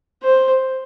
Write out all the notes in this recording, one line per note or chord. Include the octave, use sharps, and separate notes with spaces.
C5